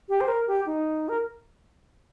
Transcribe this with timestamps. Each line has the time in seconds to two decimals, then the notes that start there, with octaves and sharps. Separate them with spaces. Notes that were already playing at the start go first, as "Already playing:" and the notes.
0.09 G4
0.21 C5
0.28 A#4
0.47 G4
0.66 D#4
1.09 A#4